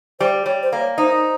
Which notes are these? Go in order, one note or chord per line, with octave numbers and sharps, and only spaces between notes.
G3 C5
G3 C#5
C5
A#3
C#5
D#4 C5